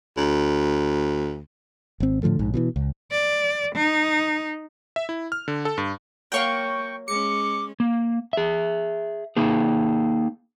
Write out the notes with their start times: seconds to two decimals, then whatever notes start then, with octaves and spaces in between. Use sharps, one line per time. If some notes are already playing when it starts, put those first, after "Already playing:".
0.17 D2
2.00 G#1 C4
2.23 A2 D3 F3 A3
2.39 A#1 G#2
2.54 B2 D#3 E3
2.76 C#2
3.12 D5
3.76 D#4
4.96 E5
5.09 E4
5.32 F6
5.48 D3
5.65 A4
5.78 G2
6.32 F#3 A#3 C#5 F5 G5 C#6
7.08 G#3 C#4 D6 C#7
7.80 A#3
8.33 G#4 E5
9.37 A#3 D#4 G#4